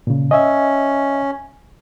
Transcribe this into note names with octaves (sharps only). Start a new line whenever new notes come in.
A#2 C#3
C#4 D#5 E5